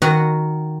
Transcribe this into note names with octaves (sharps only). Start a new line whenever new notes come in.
D#3 F#4 D#5 F#5